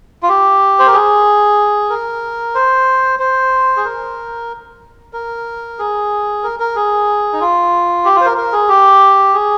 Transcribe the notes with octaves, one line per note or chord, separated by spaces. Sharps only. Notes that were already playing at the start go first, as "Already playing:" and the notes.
F4
G4
C5
A#4
G#4
A#4
C5
C5
G#4
A#4
A#4
G#4
A#4
A#4
G#4
D#4
F4
G4
F4 C5
A#4
A#4
G#4
G4
G#4